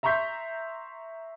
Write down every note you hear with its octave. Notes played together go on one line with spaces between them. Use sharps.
E5 A#5 C6 C#6 G6 B6